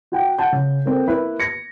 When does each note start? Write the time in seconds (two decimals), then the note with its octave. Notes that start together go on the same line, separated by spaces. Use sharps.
0.12 F#4 F#5 G5
0.38 F#5 A5 G6
0.52 C#3
0.86 A#3 C4 A4
1.08 A#3 E4 B4
1.40 G#6 A#6 C#7